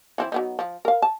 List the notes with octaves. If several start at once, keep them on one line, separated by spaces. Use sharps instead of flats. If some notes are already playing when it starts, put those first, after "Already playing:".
E3 C4 E4
F#3 B3 D#4
F3
A#4 F5
A5